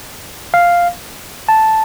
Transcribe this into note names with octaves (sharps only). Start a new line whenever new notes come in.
F5
A5